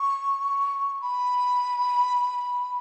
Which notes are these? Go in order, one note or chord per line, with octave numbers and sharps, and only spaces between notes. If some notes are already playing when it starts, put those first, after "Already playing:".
Already playing: C#6
B5